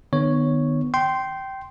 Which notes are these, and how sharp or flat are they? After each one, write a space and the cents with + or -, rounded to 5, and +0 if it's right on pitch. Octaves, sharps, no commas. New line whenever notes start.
D#3 -45 B3 +0 C#5 +0
G5 -15 C6 +0